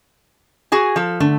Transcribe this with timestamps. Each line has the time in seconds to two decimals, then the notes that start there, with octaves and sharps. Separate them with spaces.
0.72 F#4 G#4 G#5
0.96 F3 A4
1.20 D3 A3